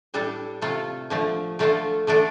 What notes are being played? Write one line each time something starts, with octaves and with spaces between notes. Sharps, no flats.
A2 G3 D4 A4
C3 A3 F4 A4
D3 F3 A3
D3 A3 F4 A4
D3 A3 D4 A4